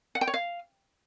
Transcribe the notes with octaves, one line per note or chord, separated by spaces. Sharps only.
F#5
G5
C#5
F5